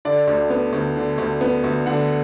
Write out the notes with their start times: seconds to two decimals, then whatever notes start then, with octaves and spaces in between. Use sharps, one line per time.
0.05 D3 D5
0.27 D2
0.50 B3
0.73 D2
0.96 D3
1.18 D2
1.41 B3
1.64 D2
1.86 D3 F#5